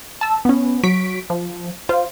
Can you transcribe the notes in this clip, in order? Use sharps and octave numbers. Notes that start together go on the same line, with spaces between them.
A5 E6
B3 C#4
F#3 C#6 B6 D7
F3
F4 C5